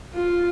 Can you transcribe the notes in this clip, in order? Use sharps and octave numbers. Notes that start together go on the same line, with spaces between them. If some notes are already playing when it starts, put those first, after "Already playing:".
F4